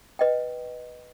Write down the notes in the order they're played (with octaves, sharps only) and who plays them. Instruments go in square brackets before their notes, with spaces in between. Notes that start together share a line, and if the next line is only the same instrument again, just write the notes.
[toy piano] B4 D#5 G5